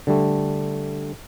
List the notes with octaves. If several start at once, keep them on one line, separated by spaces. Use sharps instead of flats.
D3 G3 A3